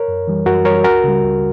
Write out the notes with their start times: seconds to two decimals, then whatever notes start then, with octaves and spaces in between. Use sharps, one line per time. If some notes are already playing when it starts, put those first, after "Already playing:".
Already playing: A#4 C#5
0.08 F#2
0.27 E3 G3
0.46 F#2 F#4 A#4
0.65 E3 G3 A#4 C#5
0.84 C#2 F#4 A#4
1.04 C#3 G3
1.23 C#2